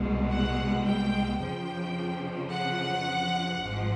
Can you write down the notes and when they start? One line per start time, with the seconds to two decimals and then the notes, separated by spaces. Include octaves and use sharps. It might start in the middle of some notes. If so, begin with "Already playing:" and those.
Already playing: C2 B2 G#3
0.30 F#5
0.85 G5
1.39 F2 C#3 F3 G5
2.50 F#5
3.61 G#1 G#2 F3